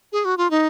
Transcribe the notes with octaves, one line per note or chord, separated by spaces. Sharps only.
G#4
F#4
F4
D#4